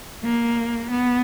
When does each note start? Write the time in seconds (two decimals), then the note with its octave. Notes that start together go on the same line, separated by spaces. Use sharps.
0.24 A#3
0.91 B3